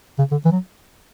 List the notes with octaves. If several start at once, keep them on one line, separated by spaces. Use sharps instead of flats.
C#3
D3
E3
F#3